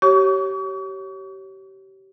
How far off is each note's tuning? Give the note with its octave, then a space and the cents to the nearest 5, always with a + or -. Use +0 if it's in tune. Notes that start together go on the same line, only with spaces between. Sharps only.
G4 -30 C#5 -10 C#6 +40